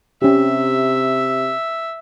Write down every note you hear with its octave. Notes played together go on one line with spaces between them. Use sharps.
C3 C#4 G4 E5